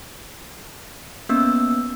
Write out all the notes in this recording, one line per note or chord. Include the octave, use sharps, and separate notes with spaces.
A#3 B3 C#4 E6